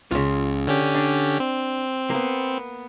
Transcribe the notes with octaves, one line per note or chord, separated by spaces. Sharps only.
C#2 C#3 F4
D3 C#4 G4
D4
C4
A#3 B3